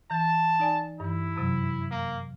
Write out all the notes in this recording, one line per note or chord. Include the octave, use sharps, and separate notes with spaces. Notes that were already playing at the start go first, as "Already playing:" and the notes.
E3 A5
D#4 D5 G#5
G2 E3 E4
F#2 C3 F#3
A#3